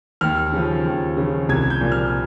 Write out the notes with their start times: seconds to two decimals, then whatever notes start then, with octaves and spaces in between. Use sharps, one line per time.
0.21 D#2 F6
0.52 C#3 F3
0.85 D#2
1.17 C#3 F3
1.48 C2 G#6
1.70 G6
1.81 A#2 F3
1.92 F6